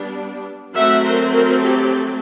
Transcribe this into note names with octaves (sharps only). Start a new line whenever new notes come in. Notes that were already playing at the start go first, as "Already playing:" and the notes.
Already playing: G3 B3 D4
F#3 A3 C4 E5 F#5
A#4 C5
A#4 C5
G4 A4